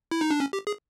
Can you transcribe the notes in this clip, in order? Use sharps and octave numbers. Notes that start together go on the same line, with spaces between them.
E4
D#4
D4
C#4
G4
G#4